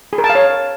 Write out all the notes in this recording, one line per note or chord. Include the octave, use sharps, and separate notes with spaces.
G#4
A#4
A5
F5
C#5